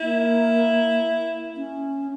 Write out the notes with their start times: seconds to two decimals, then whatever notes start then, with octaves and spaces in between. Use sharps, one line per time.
0.01 A#3 E4
1.56 C#4